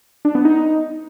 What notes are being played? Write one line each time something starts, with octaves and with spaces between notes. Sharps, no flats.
D4
B3
D#4